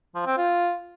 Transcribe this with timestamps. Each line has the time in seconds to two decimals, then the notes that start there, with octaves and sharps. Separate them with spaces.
0.15 F3
0.26 C4
0.38 F4